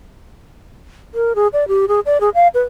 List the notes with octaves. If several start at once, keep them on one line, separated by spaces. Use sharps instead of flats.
A#4
G#4
D5
G4
G#4
D5
G#4
F5
B4